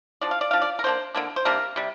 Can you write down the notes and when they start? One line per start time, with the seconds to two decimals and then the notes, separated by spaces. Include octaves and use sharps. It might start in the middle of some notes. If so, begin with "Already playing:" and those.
0.21 F3 D4 D5
0.31 F5
0.41 D5
0.51 F3 D4 F5
0.62 D5
0.79 A#4
0.84 D3 A#3 D4 C5
1.15 D3 A#3 D4
1.36 C5
1.45 C3 G3 A#3 D4 A#4
1.76 C3 G3